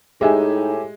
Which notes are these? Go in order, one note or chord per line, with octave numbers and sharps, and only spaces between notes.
A2 G#3 D#4 G4 E5 G#5